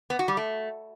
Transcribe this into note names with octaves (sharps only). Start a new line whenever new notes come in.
B3
F#4
G3
A3